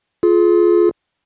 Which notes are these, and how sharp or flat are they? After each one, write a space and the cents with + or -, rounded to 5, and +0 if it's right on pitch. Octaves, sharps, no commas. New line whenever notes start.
F4 +0 G#4 +35